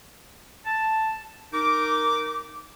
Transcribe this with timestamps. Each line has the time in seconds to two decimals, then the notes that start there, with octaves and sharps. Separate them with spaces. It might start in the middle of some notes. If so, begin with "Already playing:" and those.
0.65 A5
1.53 D#4 A#4 D6